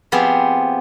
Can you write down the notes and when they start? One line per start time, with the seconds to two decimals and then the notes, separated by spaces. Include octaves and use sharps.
0.12 F3 B3 C4 G4 G#4